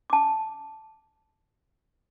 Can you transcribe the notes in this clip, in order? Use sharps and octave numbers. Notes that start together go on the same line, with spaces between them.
A5 D6